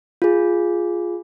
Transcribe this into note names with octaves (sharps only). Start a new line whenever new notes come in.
F4 G#4